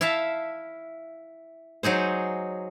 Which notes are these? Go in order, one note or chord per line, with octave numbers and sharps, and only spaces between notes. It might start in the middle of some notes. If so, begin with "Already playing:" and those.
E4 E5 F5 A5
F#3 D#4 G#4 C5